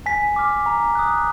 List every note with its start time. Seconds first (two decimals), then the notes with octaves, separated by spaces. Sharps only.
0.06 G#5 B6
0.36 D6 F6
0.66 A#5
0.95 D#6 F#6